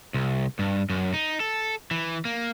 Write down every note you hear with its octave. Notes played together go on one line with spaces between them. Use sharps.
C2
G2
F#2
D#4
A4
E3
A#3